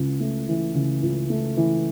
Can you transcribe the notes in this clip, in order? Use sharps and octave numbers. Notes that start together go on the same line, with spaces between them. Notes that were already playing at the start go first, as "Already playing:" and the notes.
Already playing: C#2 C#3
A3
E3
C#3
C#2
A3
E3